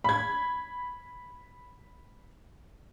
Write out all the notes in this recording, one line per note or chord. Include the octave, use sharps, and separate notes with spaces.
B5 G#6